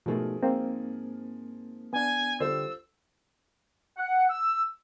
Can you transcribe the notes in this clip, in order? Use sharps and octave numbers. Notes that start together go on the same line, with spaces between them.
G#2 B2 F3 A3 G#4 A#4
G#2 A#3 C4
B3 D4 G#5
D3 G3 F4 A4 C5 E6
F#5
E6